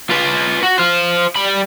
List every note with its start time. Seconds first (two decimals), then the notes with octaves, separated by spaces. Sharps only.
0.11 F4 B4
0.63 F#4
0.78 C5 F5
1.36 G3 B5